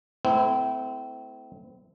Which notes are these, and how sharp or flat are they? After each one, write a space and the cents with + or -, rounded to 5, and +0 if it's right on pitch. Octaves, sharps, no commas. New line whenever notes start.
A3 +0 C4 -30 E4 +0